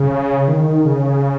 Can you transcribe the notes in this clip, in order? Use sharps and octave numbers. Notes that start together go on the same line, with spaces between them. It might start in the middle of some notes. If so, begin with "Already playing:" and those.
Already playing: C#3
D#3
C#3